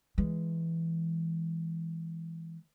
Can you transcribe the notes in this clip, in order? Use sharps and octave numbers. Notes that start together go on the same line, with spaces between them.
E3 G#3